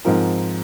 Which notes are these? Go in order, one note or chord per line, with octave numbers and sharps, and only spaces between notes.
G#2 F3 C4 F4 A#4